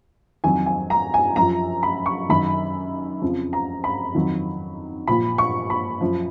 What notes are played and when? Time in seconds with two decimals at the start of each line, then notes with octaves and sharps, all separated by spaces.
0.44 F2 D#3 F#3 G#5
0.66 G#5
0.90 A#5
1.14 G#5
1.36 F#2 F3 A#5
1.83 B5
2.06 C#6
2.29 F#2 D#3 F#3 B5
3.22 F2 C#3 F3
3.53 A#5
3.84 B5
4.15 F2 D#3 F#3
5.07 A#2 F3 B5
5.38 C#6
5.70 B5
6.01 F#2 F3